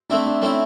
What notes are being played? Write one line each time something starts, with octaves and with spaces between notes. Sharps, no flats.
A3 C4 D4 E4
D4
A3 C4 C#4 E4